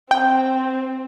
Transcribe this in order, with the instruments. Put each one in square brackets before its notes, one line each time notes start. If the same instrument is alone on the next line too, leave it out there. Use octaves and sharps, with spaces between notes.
[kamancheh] C4 [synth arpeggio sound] G5